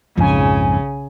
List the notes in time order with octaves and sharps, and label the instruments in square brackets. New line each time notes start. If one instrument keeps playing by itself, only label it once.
[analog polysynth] B1 G#5 [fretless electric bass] F2 G#2 F3 [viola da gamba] C#3